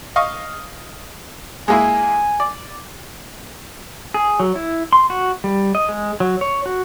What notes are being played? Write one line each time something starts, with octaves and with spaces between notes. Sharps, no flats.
D#5 F5 C#6
G#3 A#3 E4 G#5
D5
G#4
F#3
E4
C6
F#4
G3
D#5
G#3
F#3
C#5
F#4